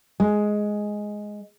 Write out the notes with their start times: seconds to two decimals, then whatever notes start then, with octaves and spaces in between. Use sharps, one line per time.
0.20 G#3